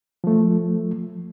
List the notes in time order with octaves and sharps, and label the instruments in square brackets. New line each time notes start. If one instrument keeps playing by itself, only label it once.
[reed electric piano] F3 A3